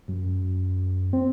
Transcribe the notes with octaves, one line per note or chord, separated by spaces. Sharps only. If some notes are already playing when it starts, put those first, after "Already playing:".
F#2
C4